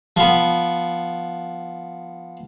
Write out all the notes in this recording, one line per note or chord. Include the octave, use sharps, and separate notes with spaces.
F3 B3